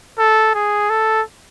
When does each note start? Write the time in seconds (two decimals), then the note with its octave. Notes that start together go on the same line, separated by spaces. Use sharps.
0.18 A4
0.54 G#4
0.90 A4